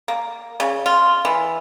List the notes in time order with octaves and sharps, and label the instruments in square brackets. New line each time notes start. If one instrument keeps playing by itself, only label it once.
[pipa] A#3
C#3
F4
E3